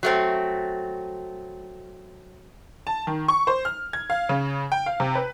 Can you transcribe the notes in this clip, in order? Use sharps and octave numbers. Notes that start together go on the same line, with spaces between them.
F#3 A3 C4
A5
D#3
C#6
C5
F6
G#6
F5
C#3
G5
F5
C3
B4